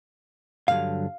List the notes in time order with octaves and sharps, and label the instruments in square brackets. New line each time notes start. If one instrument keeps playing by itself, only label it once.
[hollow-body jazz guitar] G2 D3 F#3 F5